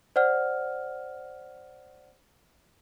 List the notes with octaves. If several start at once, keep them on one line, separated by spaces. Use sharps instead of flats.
C5 D5 F#5 F6